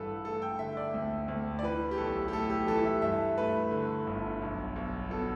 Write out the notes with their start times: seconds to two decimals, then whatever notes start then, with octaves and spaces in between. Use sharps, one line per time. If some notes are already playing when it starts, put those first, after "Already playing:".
Already playing: A1 G2 E3 G3 A4 B4
0.25 A3 A4
0.42 G5
0.59 D3 E5
0.77 D5
0.94 D2
1.28 D2
1.59 D5
1.63 E3 B4
1.91 G4
1.98 B1 A4
2.28 G4
2.33 A2 A4
2.50 G4
2.67 E3 A4
2.85 E5
3.02 G2 E5
3.37 A3 B4
3.71 D3
4.07 G1
4.42 B1
4.76 B1
5.10 B2 A4